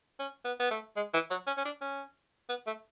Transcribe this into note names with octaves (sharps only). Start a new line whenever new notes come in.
C#4
B3
B3
A3
G#3
E3
F#3
C#4
C#4
D4
C#4
B3
A3